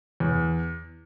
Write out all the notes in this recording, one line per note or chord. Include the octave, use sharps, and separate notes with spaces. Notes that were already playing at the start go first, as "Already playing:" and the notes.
E2